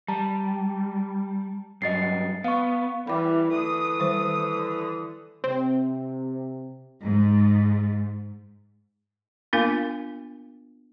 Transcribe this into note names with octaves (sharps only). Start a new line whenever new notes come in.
G3 A5 A#5
G2 F#3 D#5 A6 C7
B3 F5 C#6
E3 G3 B5 D6
D3 E3 D#6
D#3 G3 C5
C3 C4
G#2
A#3 B3 D4 F4 A#4 F5